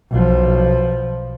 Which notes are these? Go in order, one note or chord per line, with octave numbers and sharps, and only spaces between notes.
B1 F3